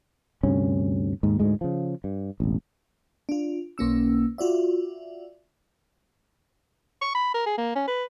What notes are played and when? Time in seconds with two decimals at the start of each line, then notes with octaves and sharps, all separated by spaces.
0.43 D2 G2 C3 C#4
1.23 D#2 G#2
1.40 D2 G#2 G#3
1.61 C#3 F3
2.04 G2
2.40 E1 A1
3.29 D4 F4
3.78 B1 A#3 C#4 E6
4.38 F4 F#4 D5 E5
7.02 C#6
7.15 B5
7.34 A#4
7.46 G#4
7.58 A#3
7.75 C#4
7.88 B4